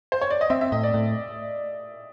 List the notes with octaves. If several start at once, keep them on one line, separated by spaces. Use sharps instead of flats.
C5
C#5
D5
D#5
C4 E5
E5
A2 D#5
D5
A2